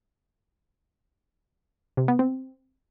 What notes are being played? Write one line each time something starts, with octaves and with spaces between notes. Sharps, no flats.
C3
B3
C4